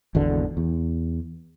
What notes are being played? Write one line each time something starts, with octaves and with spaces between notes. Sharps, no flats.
G#1 E2 B2 D3
E2